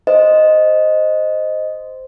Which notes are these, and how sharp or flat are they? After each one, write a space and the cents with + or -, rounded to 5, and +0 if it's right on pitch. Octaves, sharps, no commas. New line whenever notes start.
C5 -5 D#5 +0